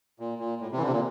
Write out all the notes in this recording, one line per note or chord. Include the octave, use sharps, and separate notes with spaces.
A#2
A#2
A2
C3
E3
D3
C3
A#2